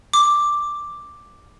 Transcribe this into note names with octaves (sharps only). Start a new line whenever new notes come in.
D6